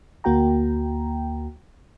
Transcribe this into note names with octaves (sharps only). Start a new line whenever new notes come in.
D2 A#3 F#4 G5 A#5